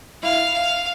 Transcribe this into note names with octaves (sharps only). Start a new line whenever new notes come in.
E4 F5
F5